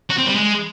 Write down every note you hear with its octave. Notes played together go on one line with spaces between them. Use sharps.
F#4
C4
G3
G#3